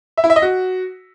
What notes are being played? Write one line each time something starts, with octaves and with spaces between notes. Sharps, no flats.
E5
E4
E5
D#5
F#4